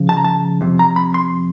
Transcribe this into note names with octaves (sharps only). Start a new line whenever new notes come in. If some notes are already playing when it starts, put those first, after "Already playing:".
Already playing: C#3 F3
A5
A#5
A5
F2 C3
A#5
B5
C6